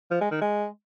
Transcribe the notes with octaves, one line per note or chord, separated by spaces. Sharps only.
F3
G#3
D#3
G#3